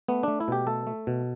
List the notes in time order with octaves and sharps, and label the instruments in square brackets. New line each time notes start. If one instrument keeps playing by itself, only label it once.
[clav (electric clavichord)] A3 B3
A3 D4
E4
B2 G4
A3 A4
A3
B2